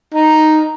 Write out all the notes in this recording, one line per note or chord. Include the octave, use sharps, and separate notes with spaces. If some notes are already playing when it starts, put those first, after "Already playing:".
D#4